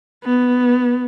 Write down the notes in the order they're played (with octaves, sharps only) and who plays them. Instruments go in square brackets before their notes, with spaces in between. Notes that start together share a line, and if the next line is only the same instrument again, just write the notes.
[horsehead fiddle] B3